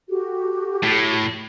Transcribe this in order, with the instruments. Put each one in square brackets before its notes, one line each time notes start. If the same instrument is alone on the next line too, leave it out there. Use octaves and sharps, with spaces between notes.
[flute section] F#4 G4 A4
[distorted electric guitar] A2